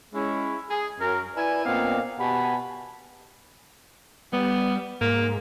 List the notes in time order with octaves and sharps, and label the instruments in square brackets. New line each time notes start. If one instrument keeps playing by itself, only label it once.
[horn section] G#3 C#4 E4
G#4
F#2 A#4
E4 B4 D5 G#5
A#2 B3 C4 D4 D#5 F5
B2 G4 F#5 G#5 A5 B5
[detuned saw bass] G3 [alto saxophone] B3
[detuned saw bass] G#2 [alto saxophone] A#3